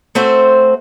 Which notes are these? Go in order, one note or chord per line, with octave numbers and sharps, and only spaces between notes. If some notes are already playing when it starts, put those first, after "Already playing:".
A3 C4 F#4 C5